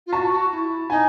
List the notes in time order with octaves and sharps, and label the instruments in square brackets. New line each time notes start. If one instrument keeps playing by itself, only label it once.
[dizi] F4
[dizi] F#4 [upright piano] A5
[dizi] F#4
E4
[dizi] D#4 [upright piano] G#5